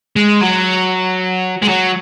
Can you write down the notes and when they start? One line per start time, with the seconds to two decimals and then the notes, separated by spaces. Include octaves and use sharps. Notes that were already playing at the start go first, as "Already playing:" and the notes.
0.16 G#3
0.41 F#3
1.62 G#3
1.68 F#3